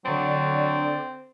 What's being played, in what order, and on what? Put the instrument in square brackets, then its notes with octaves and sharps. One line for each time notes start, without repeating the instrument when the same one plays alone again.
[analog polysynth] D3 D5 [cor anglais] F#3 [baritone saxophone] C4